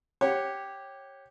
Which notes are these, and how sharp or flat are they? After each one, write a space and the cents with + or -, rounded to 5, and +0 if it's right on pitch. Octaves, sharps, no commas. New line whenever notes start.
G4 +0 C#5 -20 F#5 +0